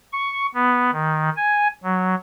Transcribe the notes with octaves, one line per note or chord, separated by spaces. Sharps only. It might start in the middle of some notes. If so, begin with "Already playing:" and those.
C#6
B3
D#3
G#5
F#3